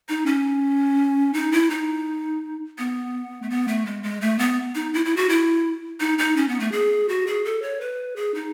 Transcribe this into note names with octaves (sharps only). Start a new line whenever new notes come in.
D#4
C#4
D#4
E4
D#4
B3
A3
B3
A3
G#3
G#3
A3
B3
D#4
E4
E4
F#4
E4
D#4
D#4
C#4
B3
A3
G#4
F#4
G#4
A4
C#5
B4
G#4
D#4